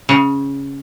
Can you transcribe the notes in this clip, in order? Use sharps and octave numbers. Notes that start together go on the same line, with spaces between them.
C#3